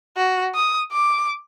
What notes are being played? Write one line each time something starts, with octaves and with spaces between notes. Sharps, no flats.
F#4
D#6
D6